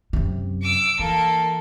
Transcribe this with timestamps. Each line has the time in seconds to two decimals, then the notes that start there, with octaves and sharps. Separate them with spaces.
0.13 F#2 C3
0.62 D6 E6
0.99 E3 A#3 A4